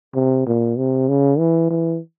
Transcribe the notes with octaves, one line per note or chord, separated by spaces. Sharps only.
C3
A#2
C3
C#3
E3
E3